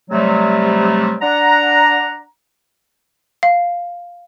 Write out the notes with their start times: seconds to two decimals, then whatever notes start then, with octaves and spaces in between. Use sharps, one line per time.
0.10 C3 F#3 G3 A3
1.22 D4 F#5 A#5
3.43 F5